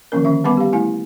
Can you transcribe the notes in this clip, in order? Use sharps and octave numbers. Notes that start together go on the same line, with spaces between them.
D3 D#3 F3 A#3 C#4 A#4
D#3 C#4 E5
G3 B3 B4 F#5 B5 D6
G4 F5
A3 E4 G#5